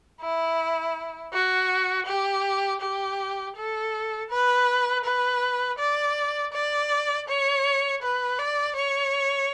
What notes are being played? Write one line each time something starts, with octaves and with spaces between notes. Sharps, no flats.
E4
F#4
G4
G4
A4
B4
B4
D5
D5
C#5
B4
D5
C#5